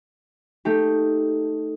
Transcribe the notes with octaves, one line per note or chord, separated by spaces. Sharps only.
A3 D#4 G4